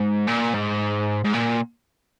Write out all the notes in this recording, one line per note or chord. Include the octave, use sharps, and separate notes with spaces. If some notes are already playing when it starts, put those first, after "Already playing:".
Already playing: G#2
A#2
G#2
G#2
A#2